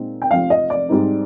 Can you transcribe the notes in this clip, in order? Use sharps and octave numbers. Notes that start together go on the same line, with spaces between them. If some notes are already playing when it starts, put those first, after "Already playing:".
Already playing: A#2 G#3 C4 D#4
G5
F1 F2 C3 F3 F5
D#5
D5
G#2 G3 C4 D#4